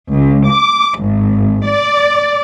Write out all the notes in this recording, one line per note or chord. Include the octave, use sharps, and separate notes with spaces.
C#2
D6
G#1
D5